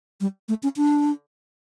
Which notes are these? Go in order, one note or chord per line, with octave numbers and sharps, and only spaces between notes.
G3
A3
C#4
D4